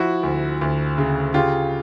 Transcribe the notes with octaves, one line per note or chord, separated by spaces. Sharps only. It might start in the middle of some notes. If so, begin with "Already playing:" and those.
Already playing: F3 E4 F#4
D2
D2
C#3
C#3 F4 G4